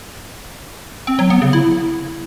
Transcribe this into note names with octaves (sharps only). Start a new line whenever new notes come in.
C4
F#3
B3
C#3
E4